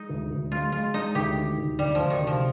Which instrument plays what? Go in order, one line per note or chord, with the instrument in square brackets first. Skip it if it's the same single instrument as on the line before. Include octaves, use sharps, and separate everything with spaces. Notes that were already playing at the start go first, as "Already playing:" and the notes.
Already playing: [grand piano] G#3 [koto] D#4
[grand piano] D2
D2
[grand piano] G#3 [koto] F4
[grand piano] G#3 [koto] F4
[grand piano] G#3 [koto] D#4
[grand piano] D2 [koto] G4
[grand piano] D#3
D2
[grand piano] D2 [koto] G3
[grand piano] D2 [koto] F3
[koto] D#3
[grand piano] C3
[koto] F3